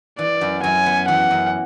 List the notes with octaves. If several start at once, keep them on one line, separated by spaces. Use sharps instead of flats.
E3 D5
F#2
F#2 G#5
B3
E3 F#5
F#2